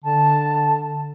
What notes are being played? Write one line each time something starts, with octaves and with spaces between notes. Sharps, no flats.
D3 A5